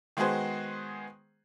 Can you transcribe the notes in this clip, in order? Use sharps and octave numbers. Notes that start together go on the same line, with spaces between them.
D#3 G#3 B3 F#4 G#4 C5